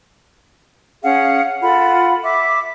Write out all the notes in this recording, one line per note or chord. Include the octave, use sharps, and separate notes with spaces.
C#4 G#4 F5 F#5
F4 A4 F#5 B5
E5 D6